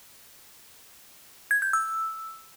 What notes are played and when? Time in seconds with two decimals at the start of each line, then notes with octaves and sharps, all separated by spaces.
1.51 G#6
1.62 G6
1.73 E6